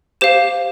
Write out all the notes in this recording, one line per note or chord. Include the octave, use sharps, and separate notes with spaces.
G4 C5 F5 E7